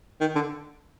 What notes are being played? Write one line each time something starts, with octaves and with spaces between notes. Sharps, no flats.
D#3
D3